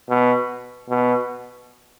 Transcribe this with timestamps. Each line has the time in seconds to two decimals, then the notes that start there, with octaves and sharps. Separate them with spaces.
0.09 B2
0.90 B2